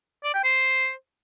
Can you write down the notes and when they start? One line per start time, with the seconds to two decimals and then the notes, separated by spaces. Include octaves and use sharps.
0.24 D5
0.34 G5
0.44 C5